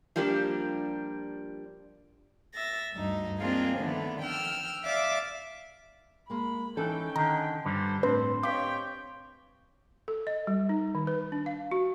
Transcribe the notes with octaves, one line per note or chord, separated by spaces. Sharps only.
F3 G3 A#3 D4 G4
E5 A6 A#6
D2 G2 D#4
G#3 A#3 C4 D4 F4 G#4
D3 D#3 F3 A3 B3
G5 E6 F6
D5 E5 F5 D6 E6
G#3 A#3 B5
E3 C#4 D#4 A4 G5
D3 D#3 A#5
G2 D3 G3 C5
A2 C4 D4 B4
G4 C#5 D#5 F5 G5 D6 B6
A4
D#5
G3
D#4
D#3
B4
D4
F5
F#4